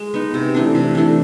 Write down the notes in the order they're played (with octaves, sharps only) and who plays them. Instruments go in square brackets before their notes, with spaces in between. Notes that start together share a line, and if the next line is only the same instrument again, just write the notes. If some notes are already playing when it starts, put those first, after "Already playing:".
Already playing: [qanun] G#3
B3 D#4
C3
E3 A3 D4
C3
E3 A3 D4